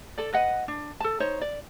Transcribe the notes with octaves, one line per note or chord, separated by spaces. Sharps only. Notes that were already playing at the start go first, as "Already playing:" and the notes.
A4 D5
B4 D#5 F#5
D4
A4 A5
D#4 C5 C#5
D5